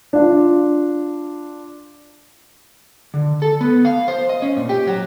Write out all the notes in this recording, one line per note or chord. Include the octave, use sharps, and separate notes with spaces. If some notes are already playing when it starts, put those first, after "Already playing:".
D4 F4
D3
A4
B3
F5
C5
D#5
C#4
A#2
G4
F#3